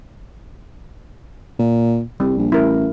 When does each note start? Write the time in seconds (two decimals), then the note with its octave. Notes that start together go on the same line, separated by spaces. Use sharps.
1.59 A#2
2.20 C2 G3
2.38 A#1
2.52 A1 E4 A#4